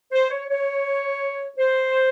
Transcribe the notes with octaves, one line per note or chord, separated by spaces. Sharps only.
C5
C#5
C#5
C5